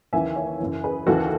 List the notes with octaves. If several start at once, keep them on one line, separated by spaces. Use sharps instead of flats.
D#2 C#3 E3 E5 G#5
C#5 E5
F#2 C#3 E3
G#4 B4
D#2 C#3 E3 F#4 A4